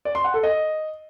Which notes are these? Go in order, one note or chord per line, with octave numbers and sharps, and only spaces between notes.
D5
C6
F#5
A4
D#5